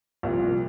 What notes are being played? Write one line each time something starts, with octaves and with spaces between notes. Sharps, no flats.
C2 A#2 F3